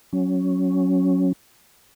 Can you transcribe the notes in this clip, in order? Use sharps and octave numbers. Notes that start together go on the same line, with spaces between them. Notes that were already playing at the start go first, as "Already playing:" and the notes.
F#3 C#4